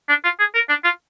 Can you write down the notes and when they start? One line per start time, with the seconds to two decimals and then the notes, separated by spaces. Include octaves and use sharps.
0.09 D4
0.24 F4
0.40 G#4
0.55 A#4
0.69 D4
0.84 F4